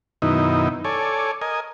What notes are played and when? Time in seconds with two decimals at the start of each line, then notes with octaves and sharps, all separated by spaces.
0.22 F#2 B2 D#3 D#4 E4
0.85 A4 C#5 D5 G#5
1.41 A#4 D#5 G#5